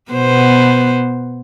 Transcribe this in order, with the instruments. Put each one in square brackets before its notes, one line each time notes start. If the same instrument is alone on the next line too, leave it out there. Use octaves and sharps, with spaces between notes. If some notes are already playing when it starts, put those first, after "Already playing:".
[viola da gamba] B2 B3 C5